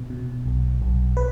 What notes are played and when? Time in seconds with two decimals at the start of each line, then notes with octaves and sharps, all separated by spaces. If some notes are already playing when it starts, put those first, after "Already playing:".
Already playing: B2
0.10 B2
0.46 B1
0.82 B1
1.17 B4